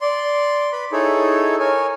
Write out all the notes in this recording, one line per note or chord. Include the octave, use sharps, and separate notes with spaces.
D5 C6
B4 B5
D#4 E4 G#4 A4 C#5
A#4 C#5 G#5